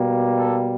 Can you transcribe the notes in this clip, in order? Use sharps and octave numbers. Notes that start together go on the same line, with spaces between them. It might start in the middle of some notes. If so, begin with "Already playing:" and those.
Already playing: B2 G3 A#3
A4